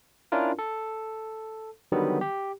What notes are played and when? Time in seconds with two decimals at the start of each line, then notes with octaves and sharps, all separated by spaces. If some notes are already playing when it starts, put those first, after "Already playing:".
0.32 C#4 D4 E4 F4 A#4
0.59 A4
1.92 D3 D#3 F#3 G3 B3
2.21 G4